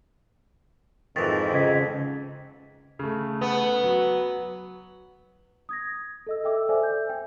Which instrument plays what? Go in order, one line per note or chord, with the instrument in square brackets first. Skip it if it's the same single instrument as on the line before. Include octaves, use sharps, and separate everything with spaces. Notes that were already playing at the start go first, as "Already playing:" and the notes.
[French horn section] F2 G#2 [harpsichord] D#3 E3 [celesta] A6
[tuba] C#3 [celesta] D#5 G#6 B6
[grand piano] C#3 A3
[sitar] B3
[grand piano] F#3
[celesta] D#6 G#6 A#6
A4 D#5 E6
A4 E5 G5 D6 E6
A4 C5 D5 E5 G#5
G6
G5